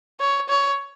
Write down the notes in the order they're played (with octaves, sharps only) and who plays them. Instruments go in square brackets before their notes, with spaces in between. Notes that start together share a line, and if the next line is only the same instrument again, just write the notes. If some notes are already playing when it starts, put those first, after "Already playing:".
[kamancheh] C#5
C#5